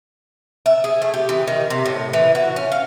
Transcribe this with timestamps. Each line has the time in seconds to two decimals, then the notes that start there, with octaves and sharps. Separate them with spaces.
0.66 E5
0.84 G#4
1.02 A3
1.14 G4
1.29 E3
1.48 D#3
1.70 C3
1.86 A2
2.13 E3
2.35 F#4
2.56 C#4
2.72 F5